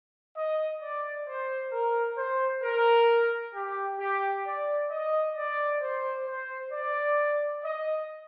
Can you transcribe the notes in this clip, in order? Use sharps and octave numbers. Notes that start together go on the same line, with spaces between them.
D#5
D5
C5
A#4
C5
A#4
G4
G4
D5
D#5
D5
C5
C5
D5
D#5